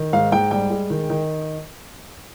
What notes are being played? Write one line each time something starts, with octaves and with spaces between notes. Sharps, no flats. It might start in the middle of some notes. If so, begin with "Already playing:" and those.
Already playing: D#3
G#2 F5
G#2 G5
G3 G5
G#3
D#3
D#3